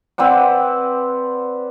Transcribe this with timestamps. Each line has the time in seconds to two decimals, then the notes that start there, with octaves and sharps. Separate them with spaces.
0.18 C4 B4 D5 F#5